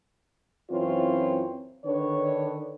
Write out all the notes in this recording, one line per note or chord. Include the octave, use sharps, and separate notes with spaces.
F#2 E3 C4 F4 C#5
D3 D#3 D4 B4 C#5